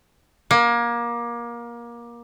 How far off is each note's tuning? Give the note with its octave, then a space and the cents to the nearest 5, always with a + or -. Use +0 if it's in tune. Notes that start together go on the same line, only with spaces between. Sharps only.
A#3 +25